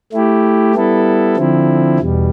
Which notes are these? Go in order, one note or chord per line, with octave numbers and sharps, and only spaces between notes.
A3 E4 G4
G3 B3 E4 A4
D3 F3 C4 E4
E2 B2 G3